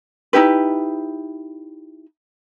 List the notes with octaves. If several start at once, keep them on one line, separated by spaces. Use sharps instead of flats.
D#4 E4 G4 B4